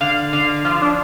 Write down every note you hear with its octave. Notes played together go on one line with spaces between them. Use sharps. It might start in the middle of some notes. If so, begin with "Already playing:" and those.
D3 F5
D3 F5
F3 F4
D4